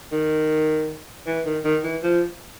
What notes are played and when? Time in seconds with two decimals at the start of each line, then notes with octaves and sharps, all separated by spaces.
0.12 D#3
1.27 E3
1.46 D#3
1.65 D#3
1.84 E3
2.03 F3